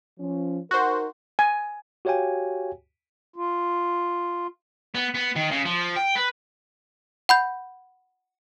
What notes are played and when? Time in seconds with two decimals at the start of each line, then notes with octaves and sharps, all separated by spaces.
0.20 F3 C#4
0.71 D#4 F#4 A#4 C5
1.39 G#5
2.05 F#4 G4 C#5 F5 G5 G#5
3.36 F4
4.95 B3
5.15 B3
5.36 D#3
5.51 C#3
5.65 F3
5.96 G5
6.15 B4
7.29 F#5 B5 G6